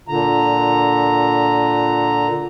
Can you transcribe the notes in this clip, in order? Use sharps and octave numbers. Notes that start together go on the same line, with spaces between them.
A#2 D3 A#5